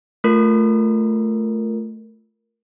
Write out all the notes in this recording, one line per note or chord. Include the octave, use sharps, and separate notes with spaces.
A3 F4 A#4